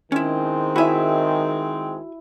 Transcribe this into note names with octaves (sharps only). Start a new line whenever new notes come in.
D#3 G#3 C4 C#4 E4
E4 F#4 E5 G#5